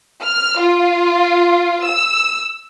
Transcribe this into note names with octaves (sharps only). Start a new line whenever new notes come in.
F6
F4
E6